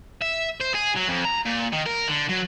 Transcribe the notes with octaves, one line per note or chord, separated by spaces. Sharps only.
E5
C5
G#4
F#3
F2
A#5
A#2
D#3
A#4
D3
F#3